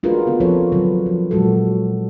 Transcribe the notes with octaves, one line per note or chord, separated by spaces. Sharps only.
D4 F4 F#4 G#4 A#4 B4
D3 B3 A4
F3 C4 F4 A4 B4 C#5
D3 F#3 B4
F3
A#2 F#3 G#3 F#4 A4